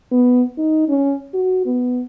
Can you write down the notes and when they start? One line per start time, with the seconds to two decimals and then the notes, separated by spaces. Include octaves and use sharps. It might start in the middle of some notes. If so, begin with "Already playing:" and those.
0.12 B3
0.58 D#4
0.89 C#4
1.34 F#4
1.65 B3